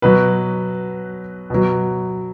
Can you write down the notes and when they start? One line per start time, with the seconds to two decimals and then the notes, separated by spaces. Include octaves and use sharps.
0.02 B2 F#3 B4
1.50 B2 F#3